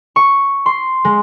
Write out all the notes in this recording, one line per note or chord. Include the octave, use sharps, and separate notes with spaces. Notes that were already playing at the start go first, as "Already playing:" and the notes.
C#6
C6
G#3